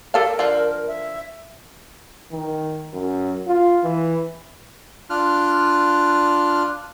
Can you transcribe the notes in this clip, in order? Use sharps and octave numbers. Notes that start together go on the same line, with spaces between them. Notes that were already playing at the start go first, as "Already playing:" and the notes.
G4 A4 A#4 F5
D3 F3 F5
E5
D#3
F#2
F4
E3
D4 F4 F6 F#6